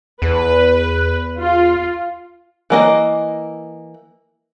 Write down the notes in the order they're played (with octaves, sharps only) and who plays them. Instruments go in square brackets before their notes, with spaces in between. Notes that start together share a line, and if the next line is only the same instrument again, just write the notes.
[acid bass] E2 [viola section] B4
[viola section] F4
[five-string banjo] E3 A#3 D#5